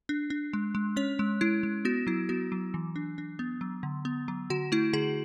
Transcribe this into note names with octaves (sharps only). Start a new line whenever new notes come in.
D4
D4
G#3
G#3
C#4 C#5
G#3
G#3 E4
G#3
B3 F#4
F#3 E4
B3 F#4
F#3
E3
D4
D4
B3
F#3
D3
B3
F#3
D3 F#4
A3 E4
D3 G#4